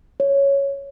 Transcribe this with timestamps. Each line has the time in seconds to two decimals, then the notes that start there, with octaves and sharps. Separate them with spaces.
0.20 C#5